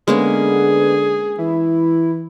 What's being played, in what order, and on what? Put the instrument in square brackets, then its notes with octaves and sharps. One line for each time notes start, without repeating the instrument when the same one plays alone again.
[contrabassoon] D3 [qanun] G#3 A#3 C#4 [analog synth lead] B3 [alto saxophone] G#4
[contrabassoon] E3 [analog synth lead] E4